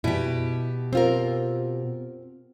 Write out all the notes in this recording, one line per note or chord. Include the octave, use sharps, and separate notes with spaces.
B2 E4 G4
C4 F4 A#4